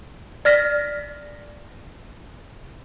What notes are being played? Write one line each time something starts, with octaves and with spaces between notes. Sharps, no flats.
D5 F6 A#6 B6